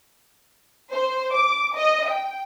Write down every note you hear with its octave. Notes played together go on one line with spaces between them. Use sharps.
C5
D6
D#5
G5